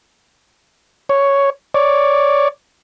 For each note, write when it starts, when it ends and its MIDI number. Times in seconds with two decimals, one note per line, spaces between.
1.09 1.50 73
1.74 2.48 73
1.74 2.48 74